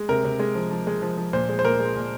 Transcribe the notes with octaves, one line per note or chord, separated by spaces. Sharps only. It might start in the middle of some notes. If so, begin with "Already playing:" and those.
Already playing: G#3
C3 A#4
C3
G#3
F3
F3
G#3
F3
F3
A#2 C5
G#3
C5
A#2 A#4
G#3
A#2